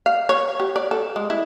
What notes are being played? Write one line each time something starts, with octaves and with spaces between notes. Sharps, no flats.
F5
C#5
G4
D5
A4
G#3
E4